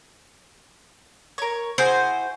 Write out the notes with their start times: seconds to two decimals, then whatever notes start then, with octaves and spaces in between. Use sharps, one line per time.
1.38 A#4 C#5
1.78 E4 F#4 G#4 C5